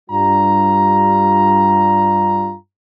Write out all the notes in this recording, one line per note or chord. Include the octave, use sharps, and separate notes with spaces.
G2 G3 F4 A#5